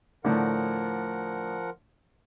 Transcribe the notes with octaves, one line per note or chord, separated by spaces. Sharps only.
A2 D3 F3 A#4 F#5